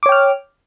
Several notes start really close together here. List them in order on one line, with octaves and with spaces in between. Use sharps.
D6 C#5 G5 F6